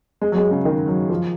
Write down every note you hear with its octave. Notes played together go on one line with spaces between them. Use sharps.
G#3
F#3
G#3
C#3
D#3
F#3
F3